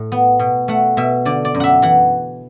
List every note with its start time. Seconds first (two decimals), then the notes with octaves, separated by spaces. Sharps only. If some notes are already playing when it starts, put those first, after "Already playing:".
Already playing: A2
0.12 B3
0.40 B2
0.68 A3 F#5
0.97 B2 E5
1.25 D3 D5
1.45 D5
1.55 F#2
1.60 E5 F#5
1.82 E3 F#5